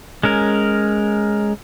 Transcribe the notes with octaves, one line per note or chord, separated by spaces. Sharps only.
G#3 C#4 A#4